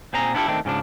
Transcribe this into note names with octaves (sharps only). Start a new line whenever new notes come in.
A#2 C4 G#4 A#5
B3 D4 E4 F4 G4 A4
D#3 A3 C4 D4
G#2 C#3 F3 D4